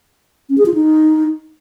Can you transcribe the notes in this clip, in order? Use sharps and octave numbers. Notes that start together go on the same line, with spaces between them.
C#4
G#4
F4
D#4